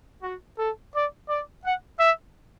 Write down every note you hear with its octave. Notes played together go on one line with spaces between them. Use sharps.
F#4
A4
D5
D5
F#5
E5